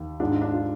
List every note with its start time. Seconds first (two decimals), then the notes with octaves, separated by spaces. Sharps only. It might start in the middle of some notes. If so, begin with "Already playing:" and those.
Already playing: D#2
0.20 G#2 D4 F4
0.32 D#4
0.42 D4
0.53 F4